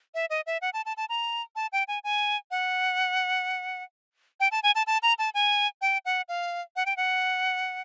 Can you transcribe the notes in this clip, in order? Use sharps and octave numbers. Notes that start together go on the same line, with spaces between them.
E5
D#5
E5
F#5
A5
A5
A5
A#5
A5
G5
G#5
G#5
F#5
G5
A5
G#5
A5
A5
A#5
A5
G#5
G5
F#5
F5
F#5
G5
F#5